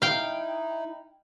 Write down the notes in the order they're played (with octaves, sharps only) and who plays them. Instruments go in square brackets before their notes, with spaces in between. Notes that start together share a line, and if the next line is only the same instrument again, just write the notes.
[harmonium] D#4 E4 [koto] F5 G5